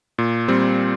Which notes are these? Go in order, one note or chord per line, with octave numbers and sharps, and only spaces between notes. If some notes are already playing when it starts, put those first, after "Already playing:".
A#2
G3 C4